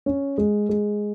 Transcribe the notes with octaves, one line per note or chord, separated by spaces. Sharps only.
C#4
G#3
G#3